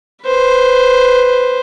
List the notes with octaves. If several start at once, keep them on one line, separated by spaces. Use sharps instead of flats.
B4 C5